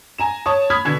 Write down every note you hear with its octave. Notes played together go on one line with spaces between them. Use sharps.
G#5 A#5 E7
C#5 A5 D#6
B5 D#6 F6 G#6 B6
B2 D3 G#6